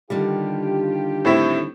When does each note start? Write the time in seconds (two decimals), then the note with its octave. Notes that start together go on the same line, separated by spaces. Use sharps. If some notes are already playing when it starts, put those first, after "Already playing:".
0.10 D3 D#3 G3 F4 G4
1.25 A2 C4 E4